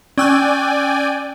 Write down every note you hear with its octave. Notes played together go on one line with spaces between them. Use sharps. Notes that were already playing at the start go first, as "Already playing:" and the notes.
C#4 D5 G5 G#5 E6 F#6